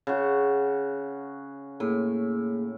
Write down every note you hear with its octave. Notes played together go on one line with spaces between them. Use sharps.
C#3 F#4
A2 A#3 G#4